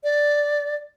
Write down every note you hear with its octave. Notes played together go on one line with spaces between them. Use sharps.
D5